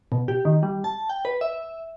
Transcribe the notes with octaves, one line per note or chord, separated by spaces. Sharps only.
B2
G4
D#3
G3
A5
G5
B4
E5